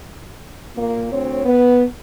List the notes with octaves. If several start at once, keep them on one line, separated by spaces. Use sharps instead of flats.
A#2 A#3
D2 C4 C#5
B3